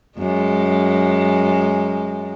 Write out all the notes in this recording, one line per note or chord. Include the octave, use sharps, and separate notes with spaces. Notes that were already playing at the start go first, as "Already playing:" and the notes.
F#2 G#3